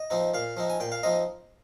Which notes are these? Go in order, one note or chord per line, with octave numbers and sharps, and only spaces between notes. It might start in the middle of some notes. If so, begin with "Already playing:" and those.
Already playing: D#5
F3 C4 D#4
A#2 F5
F3 C4 D#4
G#5
A#2 G5
F5
F3 C4 D#4 D#5